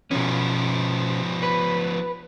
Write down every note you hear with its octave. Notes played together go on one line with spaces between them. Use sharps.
B2 F3 B3 C#4
B4